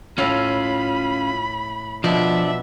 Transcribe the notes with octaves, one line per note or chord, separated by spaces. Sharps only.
A2 C#4 F4 B5
B2 F3 D4 E5